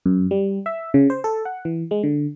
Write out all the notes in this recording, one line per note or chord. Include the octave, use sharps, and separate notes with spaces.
F#2
G3
E5
C#3
C5
A4
F#5
E3
G#3
D3